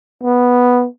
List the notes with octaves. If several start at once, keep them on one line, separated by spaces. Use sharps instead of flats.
B3